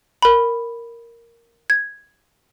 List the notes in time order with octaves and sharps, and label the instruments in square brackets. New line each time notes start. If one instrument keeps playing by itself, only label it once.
[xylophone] A#4 B5
G#6